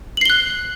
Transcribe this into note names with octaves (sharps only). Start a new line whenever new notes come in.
F#6 C7 F#7 G7